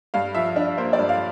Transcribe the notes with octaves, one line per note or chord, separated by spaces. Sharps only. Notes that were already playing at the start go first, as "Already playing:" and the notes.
G2 F5
F3 E5
D4
A#3 C5
D5
G2
F5